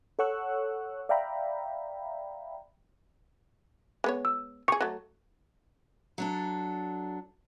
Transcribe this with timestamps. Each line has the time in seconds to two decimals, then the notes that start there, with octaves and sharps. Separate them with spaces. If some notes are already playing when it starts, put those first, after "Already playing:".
0.19 A4 C#5 F#5 C#6 E6 F#6
1.09 D5 E5 F5 G5 A#5 B5
4.04 G#3 B3 C#5
4.25 E6
4.68 G4 G#4 C#6 C#7
4.81 F#3 A3
6.18 F#3 D4 A4